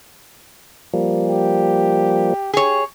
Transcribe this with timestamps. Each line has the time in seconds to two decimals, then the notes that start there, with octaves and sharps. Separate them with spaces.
0.93 F3 G3 A#3
1.27 G4
2.53 G4 G#4 C#5